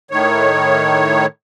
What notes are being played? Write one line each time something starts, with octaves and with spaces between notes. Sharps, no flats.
A2 D#3 C#5